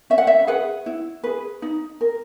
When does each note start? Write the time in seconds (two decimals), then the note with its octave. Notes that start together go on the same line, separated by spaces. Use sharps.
0.10 C#4 E5
0.18 F#5
0.27 E5
0.47 G#4 B4 F#5
0.86 E4
1.23 G#4 B4
1.62 D#4
2.01 A#4